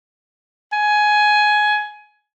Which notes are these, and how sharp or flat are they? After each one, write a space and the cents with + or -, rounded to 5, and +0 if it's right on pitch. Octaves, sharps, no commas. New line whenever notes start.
G#5 +15